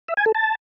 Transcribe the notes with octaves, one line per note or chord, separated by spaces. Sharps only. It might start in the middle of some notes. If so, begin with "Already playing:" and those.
E5
G#5
A4
A5